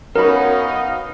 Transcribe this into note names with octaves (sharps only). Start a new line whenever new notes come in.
F#2 F#3 B3 C#4 D#4 A#4 F5 B5